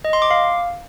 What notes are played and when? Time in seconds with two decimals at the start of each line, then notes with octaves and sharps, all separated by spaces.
0.05 D#5
0.13 C6
0.22 D6
0.31 F5